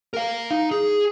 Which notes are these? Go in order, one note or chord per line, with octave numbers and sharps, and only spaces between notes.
A#4 F5
D#4
G#4